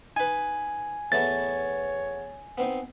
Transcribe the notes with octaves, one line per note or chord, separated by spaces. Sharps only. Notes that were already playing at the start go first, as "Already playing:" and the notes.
D#4 B4 G#5
E2 A3 B3 C#5 A6
B3 C4 D#4